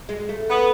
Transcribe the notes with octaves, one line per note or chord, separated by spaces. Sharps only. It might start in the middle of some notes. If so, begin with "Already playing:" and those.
G#3
A3
B3